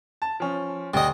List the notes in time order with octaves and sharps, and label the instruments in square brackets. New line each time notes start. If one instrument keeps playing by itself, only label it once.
[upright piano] A5
F3 C#4
[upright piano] D2 [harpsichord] G3 D#5